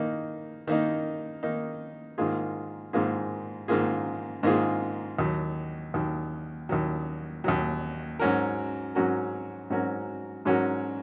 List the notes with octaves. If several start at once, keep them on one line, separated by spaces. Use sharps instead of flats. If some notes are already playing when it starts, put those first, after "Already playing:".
Already playing: D#3 A#3 D#4
D#3 A#3 D#4
D#3 A#3 D#4
G#2 D#3 A#3 F4 G#4
G#2 D#3 A#3 F4 G#4
G#2 D#3 A#3 F4 G#4
G#2 D#3 A#3 F4 G#4
D#2 D#3 F#3
D#2 D#3 F#3
D#2 D#3 F#3
D#2 D#3 F#3
G#2 F#3 C#4 F#4 A#4
G#2 F#3 C#4 F#4 A#4
G#2 F#3 C#4 F#4 A#4
G#2 F#3 C#4 F#4 A#4